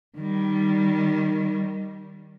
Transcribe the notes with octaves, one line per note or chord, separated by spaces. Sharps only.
D#3 G3